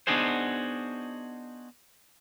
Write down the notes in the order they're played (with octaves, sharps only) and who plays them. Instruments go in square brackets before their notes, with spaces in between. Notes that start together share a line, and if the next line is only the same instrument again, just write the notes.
[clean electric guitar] B3 D4 D#4 F#4 G#4 C5